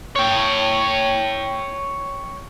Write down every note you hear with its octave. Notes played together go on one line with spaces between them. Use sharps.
C#5 G5